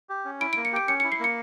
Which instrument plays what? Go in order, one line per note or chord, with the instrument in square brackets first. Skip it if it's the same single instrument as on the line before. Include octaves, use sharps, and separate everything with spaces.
[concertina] G4
C#4
[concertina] E4 [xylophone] D7
[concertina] A#3 [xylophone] D7
[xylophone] C#7
[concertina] G4 [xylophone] D7
[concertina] C#4 [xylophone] C#7
[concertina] E4 [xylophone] C#7
[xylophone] C7
[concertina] A#3 [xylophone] C#7